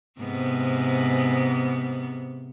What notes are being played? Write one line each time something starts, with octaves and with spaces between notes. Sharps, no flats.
G#2 C3 B3